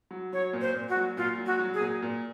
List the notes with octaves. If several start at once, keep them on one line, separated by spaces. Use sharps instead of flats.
F#3
F#3 C#5
A#2
C5
A#2
F#4
F#3
A#2 F4
F#3
F#4
F#3
G#4
A#2
A#2